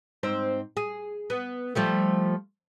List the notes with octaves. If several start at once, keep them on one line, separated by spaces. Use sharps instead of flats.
G#2 C4 C5
G#4
B3
F3 G3 A3